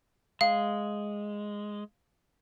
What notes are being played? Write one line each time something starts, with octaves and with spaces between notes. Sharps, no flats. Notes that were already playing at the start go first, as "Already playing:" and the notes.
G#3 F5